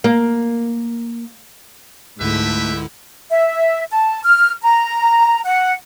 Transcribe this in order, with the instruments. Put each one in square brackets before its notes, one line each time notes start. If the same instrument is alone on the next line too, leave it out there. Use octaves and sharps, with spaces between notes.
[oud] A#3
[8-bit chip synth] C#2 D3 E4 [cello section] G#2 [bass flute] A3 [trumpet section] G4 B4 E5
[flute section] E5
A5
F6
A#5
F#5